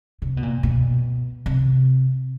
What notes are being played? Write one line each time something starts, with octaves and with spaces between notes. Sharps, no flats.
C3
B2
A#2
B2
C3